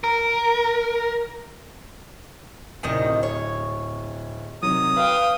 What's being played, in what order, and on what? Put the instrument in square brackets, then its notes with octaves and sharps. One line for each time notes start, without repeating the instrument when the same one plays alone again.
[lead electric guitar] A#4
[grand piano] D1 [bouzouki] C3 D#3 D#5
[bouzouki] C#5
[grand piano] C3 D#3 F#3 [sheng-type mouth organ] D#6
[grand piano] B4 [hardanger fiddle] F5 G5